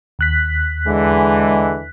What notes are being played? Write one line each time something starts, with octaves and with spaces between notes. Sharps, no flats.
D#2 F#6 B6
D3 E3 G#3